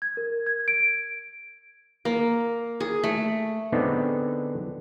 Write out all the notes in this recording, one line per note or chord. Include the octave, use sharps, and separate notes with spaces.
G#6
A#4
G#6
D7
A#3
G#4
A3
D3 G#3 B3 C4 D4 D#4